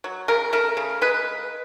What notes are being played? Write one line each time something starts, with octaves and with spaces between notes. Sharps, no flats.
F#3
C#3 A#4
A3 A#4
C#3
G#3 B4